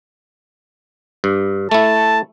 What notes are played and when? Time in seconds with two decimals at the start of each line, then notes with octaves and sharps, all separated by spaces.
1.24 G2
1.71 A3 E4 A5